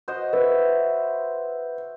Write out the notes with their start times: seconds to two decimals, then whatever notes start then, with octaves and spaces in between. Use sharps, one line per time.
0.08 F#4 C5 D#5
0.33 B4 E5